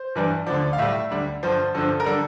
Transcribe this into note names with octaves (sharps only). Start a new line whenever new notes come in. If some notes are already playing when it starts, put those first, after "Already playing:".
Already playing: C5
G2 E3 G3
D2 D3 F3 D5
F5
A2 G3 E5
D2 D3 G3
G2 D3 F3 C5
G2 D3 F3 A4
A#4
D3 G3 A4